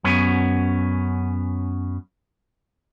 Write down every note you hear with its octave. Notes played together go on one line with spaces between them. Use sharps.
F#2 B3 C#4